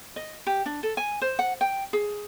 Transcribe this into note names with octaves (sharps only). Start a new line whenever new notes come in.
D#5
G4
D4
A4
G#5
C5
F#5
G5
G#4